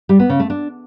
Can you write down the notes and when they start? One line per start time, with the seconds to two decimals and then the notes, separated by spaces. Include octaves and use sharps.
0.09 G3
0.19 B3
0.29 C#3
0.40 A3
0.50 D4